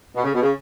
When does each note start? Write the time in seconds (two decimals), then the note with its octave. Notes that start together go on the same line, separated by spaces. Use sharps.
0.15 B2
0.24 C#3
0.33 B2
0.42 C#3